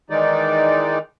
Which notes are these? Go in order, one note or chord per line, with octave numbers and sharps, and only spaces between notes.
D#3 E3 G#3 D#4 D5